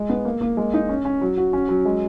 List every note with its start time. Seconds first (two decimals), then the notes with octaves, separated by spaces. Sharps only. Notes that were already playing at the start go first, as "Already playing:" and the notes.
Already playing: G#3
0.09 B3
0.25 A#3
0.41 A#3
0.57 G#3
0.74 D#4
0.89 C#4
1.05 C#4
1.22 F#3
1.37 F#4
1.53 C#4
1.69 F#3
1.85 G#3